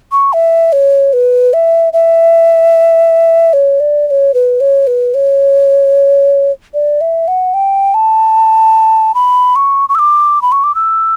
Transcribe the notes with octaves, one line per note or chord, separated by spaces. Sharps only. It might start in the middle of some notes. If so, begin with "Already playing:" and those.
C#6
E5
C#5
B4
E5
E5
C#5
D5
D5
C#5
B4
C#5
B4
C#5
D5
E5
F#5
G5
A5
B5
C#6
C#6
E6
D6
B5
C#6
D6
E6